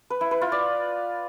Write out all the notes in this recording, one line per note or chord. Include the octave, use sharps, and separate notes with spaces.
B4
E4
B4
F4
D5